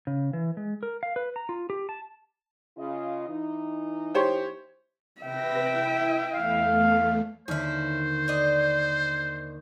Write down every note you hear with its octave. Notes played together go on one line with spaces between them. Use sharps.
C#3
E3
G#3
A#4
F5
B4
A#5
F4
G4
A5
C#3 F4 D#5
E3 D#4
G4 C5 C#5
C3 B4 E5 G5 A#6
E4
E2 A3 F5
D#2 D3 C#4 E4 C5 F6
D4 D#5